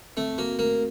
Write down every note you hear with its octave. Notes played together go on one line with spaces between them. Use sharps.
A3 C4
A#3 F#4
A3 A#3